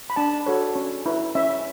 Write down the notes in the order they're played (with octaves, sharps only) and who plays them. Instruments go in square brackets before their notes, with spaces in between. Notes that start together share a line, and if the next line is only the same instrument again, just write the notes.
[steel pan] B5
D4 A5
F#4 A4 C#5
C#4
E4 B4
C#4 E5